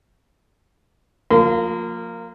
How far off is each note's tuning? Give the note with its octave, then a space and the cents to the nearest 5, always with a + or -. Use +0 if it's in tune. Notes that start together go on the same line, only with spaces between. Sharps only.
F3 +25 A#3 -15 C6 -40